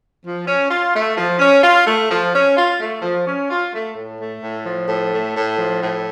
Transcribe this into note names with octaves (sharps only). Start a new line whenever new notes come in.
F3
C#4
F4
A3
F3
C#4
F4
A3
F3
C#4
F4
A3
F3
C#4
F4
A3
A2
A3
A2
F3
A2
A3
A2
F3
A2